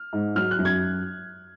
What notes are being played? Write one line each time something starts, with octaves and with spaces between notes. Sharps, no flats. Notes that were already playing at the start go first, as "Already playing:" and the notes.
Already playing: F6
G#2
F#3 F6
F#6
F#2
G#6